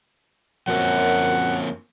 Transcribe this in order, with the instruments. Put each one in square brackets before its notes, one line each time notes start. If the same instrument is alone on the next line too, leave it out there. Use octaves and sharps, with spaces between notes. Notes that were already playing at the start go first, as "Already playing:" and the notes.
[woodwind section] F#2 [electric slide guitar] F3 A#3 C4 [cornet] F#5